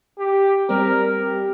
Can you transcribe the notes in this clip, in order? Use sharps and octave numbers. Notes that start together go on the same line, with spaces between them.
G4
G3 C4 A#4
G4